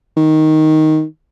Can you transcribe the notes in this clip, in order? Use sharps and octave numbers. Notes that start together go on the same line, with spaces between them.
D#3